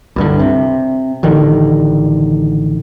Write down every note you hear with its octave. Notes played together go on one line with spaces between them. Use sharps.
C2 G2 D3
C3
A1 D3 D#3